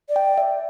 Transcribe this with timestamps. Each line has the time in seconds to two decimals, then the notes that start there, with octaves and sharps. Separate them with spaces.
0.08 D5
0.16 G5
0.38 E5